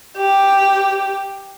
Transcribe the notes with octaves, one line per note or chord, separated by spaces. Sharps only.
G4